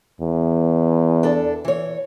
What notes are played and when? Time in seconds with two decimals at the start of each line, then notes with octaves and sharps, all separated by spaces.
0.21 E2
1.23 D4 A4
1.65 E3 C#5